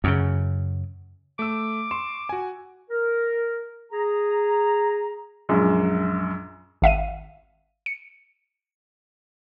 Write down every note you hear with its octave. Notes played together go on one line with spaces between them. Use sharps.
F#2 C#3
A3 D6 E6
C6 C#6 E7
F#4 G#5
A#4
G#4 A#5
A#1 F#2 G#3
G#1 E5 F5 D#7
C#7